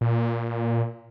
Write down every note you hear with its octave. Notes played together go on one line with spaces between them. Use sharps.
A#2